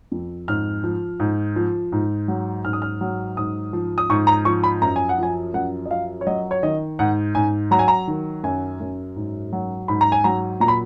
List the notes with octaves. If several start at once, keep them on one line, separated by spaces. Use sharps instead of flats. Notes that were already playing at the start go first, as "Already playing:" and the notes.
F2
G#2 F6
F3
G#2
F3
G#2
F#3
G#2 F6
D#6
F6
F#3
G#2 D#6
F3
D#6
G#2 C#6
A#5
F3 C#6
B5
F#2 A#5
G#5
F#5
F3 G#5
F#2 F#5
D#5
F3 F5
C#5
F#3 D#5
C#5
D#3 D#5
G#2 F#5
G#2 G#5
F#3 A#5
G#5
A#5
D#3
F#2 G#5
F#2
G#2
F#3
G#2 B5
A#5
G#5
F#3 A#5
A#2 A#5
B5